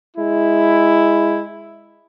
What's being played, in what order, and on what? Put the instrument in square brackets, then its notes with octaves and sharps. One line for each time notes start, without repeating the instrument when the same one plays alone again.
[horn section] G#3 E4